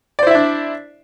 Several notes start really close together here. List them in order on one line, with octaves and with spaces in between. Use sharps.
D5 C5 E4 E5 D4